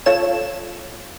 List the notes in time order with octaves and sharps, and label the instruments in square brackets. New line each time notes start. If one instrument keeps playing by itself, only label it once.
[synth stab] F4 A4 C#5 E7